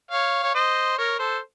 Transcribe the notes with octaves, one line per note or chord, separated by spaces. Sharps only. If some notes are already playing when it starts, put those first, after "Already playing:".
C#5 F5
C#5
C5 D#5
A#4 C#5
A4 C5